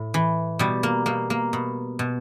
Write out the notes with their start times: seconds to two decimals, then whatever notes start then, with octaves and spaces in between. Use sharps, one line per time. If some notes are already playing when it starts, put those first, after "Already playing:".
Already playing: A2
0.14 E3
0.59 B2 G3
0.83 A#3
1.06 B2 A#3
1.30 A#3
1.53 B2
1.99 B2